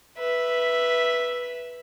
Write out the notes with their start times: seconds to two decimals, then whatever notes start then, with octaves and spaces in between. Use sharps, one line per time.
0.18 B4 E5